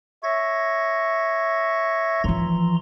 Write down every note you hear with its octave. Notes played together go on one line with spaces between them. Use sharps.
C#5 E5 C#6 G#6 A#6
E3 F3 A#5 C6